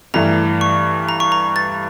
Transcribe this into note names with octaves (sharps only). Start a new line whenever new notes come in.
G2 E3 A3 A#5
C#6
A#5
C#6
A#5
A6